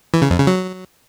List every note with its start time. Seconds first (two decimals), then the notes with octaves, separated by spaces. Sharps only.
0.14 E3
0.22 C#3
0.30 F2
0.39 C#3
0.47 F#3